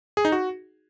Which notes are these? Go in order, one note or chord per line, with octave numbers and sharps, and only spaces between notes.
G#4
D#4
F#4